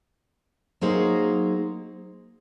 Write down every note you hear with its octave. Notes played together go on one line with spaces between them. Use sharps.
F#3 A#3 D#4 G#4 C5